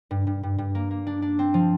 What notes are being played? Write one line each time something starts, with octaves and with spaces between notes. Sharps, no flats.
G2
G2
G2
G2
A#3
A#3
D4
D4
C4
F3